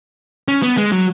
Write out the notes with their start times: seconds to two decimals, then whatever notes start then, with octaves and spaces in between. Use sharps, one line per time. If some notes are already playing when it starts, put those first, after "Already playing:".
0.48 C#4
0.62 B3
0.77 G#3
0.92 F#3